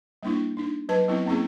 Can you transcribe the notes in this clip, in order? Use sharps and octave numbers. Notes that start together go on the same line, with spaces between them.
G3 A#3 D4 E4
D4 D#4
F#3 B4 A5
F#3 B3 C4 E4
A#3 C4 C#4 E4 G#4